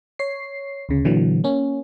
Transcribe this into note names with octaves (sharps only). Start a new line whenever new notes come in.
C#5 C7
D2 C#3
A#2 D3 E3 F#3
A#3 C#4